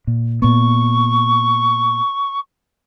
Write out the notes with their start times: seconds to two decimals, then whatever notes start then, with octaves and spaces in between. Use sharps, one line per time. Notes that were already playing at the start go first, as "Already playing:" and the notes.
0.07 A#2
0.42 A#2 B3 C#6